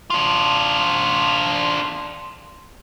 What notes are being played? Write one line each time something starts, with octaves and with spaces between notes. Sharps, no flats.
D4 F4